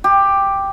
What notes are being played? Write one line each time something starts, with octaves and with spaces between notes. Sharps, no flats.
G4